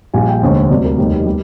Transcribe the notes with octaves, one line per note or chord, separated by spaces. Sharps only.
A#1 A#2 G3 G#5
G5
F1 D#2 D3 G#3 C5
D2 C3 G3 D5
A#4
F1 D#2 D#3 G3
G3